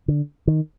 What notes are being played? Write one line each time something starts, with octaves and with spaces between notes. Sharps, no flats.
D3
D#3